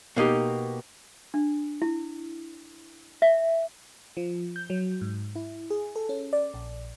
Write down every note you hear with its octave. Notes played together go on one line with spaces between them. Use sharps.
B2 A#3 D#4 G4
D4
E4
E5
F3
G6
F#3
G#2
E4
G#4
A4
C#4
D5
A#1